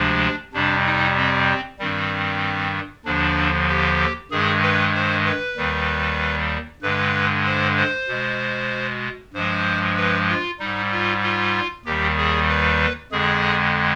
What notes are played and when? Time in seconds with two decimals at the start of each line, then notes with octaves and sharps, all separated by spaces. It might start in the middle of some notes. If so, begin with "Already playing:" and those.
Already playing: D2 C3 F3 G#3 D4
0.53 F2 C3 G3 D4
0.85 D#4
1.16 C4
1.79 G2 D#3 G3 C4
3.05 D#2 D3 F3 D4
3.69 G4
4.31 G2 D#3 G#3 G#4
4.62 B4
4.94 C5
5.25 B4
5.57 D#2 D#3 G3
6.82 G2 D3 G#3 B4
7.46 C5
7.77 C5
8.08 B2 G#3
9.34 G2 F3 G#3 C5
9.96 B4
10.29 F4
10.60 G#2 G3 D#4
10.92 F4
11.23 F4
11.85 D#2 D#3 G3 G4
12.18 G#4
12.49 B4
13.12 F2 D3 G#3 G#4